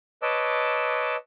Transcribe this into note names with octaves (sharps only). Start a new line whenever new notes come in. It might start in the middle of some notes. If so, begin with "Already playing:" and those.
B4 C#5 D#5 A5 D6 E6